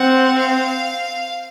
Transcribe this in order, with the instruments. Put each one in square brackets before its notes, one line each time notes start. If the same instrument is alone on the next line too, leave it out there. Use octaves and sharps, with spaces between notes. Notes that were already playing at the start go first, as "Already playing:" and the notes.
Already playing: [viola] C4 [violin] F#5
[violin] F5